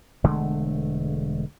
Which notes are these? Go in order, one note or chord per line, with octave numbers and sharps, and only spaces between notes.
E1 D3 G#3 A3